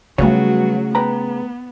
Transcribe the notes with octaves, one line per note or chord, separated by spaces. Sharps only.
C#3 F#3 G3 A3 B3 F4 F#4 C#5
B3 B4 G5 A#5